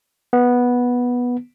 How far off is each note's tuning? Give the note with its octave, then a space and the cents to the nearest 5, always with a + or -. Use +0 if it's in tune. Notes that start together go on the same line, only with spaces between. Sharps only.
B3 -10